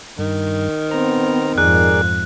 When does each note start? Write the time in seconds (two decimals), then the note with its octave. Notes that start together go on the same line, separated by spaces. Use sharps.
0.18 G2 D#3
0.91 B3 C4 A#5
1.58 F2 G#2 G#4 A#4 D5 F#6